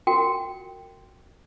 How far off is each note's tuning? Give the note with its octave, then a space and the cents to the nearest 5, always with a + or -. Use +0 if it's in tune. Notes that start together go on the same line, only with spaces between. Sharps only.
F#4 +0 A#4 -30 G5 +0